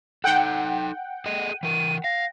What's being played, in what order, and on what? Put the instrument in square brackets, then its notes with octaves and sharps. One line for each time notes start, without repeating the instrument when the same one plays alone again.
[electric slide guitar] D#4 A4 [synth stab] F#5 G5
[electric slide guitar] G#4 A4 D#5 [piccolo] D#7
[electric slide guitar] E3 A#4 [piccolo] D#7
[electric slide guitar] F5 [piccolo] A#6